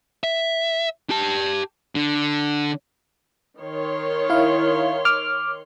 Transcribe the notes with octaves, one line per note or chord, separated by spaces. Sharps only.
E5
G4 A5
D3
D#3 C#5 C6
E4 F5
D6 F6